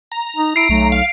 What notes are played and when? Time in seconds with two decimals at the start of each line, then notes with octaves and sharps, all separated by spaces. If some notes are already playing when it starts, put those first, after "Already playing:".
0.12 A#5
0.36 D#4
0.56 E4 C7 D7
0.70 B1 A3
0.92 F5